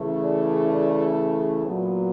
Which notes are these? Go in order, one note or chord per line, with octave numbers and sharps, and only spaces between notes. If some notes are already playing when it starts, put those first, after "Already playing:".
Already playing: C#3 E3 A3
D5
A#2 F#3 B3